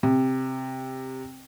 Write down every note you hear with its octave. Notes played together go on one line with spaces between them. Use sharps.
C3